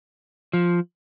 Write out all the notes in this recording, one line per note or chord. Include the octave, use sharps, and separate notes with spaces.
F3